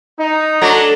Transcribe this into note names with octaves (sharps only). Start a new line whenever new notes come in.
D#4
F#3 A3 D4 A#5